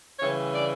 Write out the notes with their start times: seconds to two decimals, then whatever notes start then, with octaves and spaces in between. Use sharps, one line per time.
0.19 C#3 E3 G3 C#5
0.54 D5